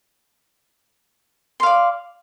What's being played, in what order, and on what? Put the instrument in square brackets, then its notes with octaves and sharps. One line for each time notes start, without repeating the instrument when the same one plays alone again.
[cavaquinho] C6
F5
D5